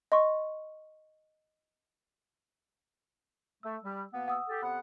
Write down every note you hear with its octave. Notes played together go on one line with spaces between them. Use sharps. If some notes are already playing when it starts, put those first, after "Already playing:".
D#5 C6 C#6
A3 E6
G3
B2 A#3 B3
F#5 D#6 E6
G4 A4
C3 B3 A4 F#5 B5